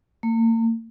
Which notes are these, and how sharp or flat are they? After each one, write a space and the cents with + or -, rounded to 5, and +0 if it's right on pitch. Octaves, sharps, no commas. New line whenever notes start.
A#3 -40